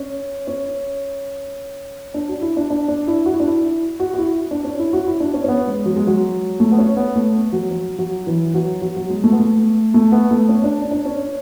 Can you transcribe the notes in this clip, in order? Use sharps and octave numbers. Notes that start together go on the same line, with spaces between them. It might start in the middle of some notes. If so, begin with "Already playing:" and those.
Already playing: C#4
C#4
D4
F#4
E4
D4
D4
D4
E4
F#4
E4
D4
E4
F#4
F#4
E4
D4
C#4
E4
F#4
E4
D4
C#4
C#4
B3
G#3
F#3
G#3
F#3
A3
B3
C#4
B3
A3
F#3
F#3
F#3
E3
F#3
F#3
F#3
G#3
A3
B3
A3
A3
B3
A3
C#4
D4
D4
C#4